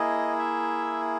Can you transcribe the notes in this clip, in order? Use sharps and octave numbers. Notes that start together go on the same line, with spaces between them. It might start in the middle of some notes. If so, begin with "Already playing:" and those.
Already playing: A#3 E4 G#4 D#5
E5